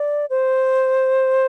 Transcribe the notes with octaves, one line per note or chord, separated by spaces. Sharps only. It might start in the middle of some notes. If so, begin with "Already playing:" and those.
Already playing: D5
C5